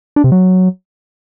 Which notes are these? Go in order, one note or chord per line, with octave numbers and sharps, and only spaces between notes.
D4
C3
F#3